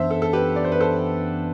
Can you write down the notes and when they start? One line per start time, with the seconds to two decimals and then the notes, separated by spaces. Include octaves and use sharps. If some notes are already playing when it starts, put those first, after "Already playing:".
Already playing: F#2 E3 B3 D4 C5 E5
0.11 A4
0.22 A4
0.33 G4 B4
0.56 D5
0.65 C5
0.72 B4
0.80 A4 C5